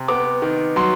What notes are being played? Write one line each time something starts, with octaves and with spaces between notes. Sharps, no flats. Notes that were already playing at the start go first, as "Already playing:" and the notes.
Already playing: C3
B3 D6
D#3
F#3 C6